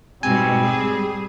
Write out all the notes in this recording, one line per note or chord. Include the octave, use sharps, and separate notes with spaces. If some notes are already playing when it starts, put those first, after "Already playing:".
G#2 B2 G3 C4 G#5
G#4